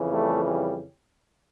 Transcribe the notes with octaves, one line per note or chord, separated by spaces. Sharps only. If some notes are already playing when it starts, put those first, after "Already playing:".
Already playing: F2 C#3 E3
G3 A3
G3